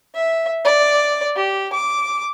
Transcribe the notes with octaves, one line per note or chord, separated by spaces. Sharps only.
E5
D5
G4
D6